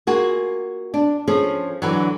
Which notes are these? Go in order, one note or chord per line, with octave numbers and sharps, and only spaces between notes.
A#3 F4 F#4 G#4
D4
F3 C#4 G#4 A4
D3 E3 F#3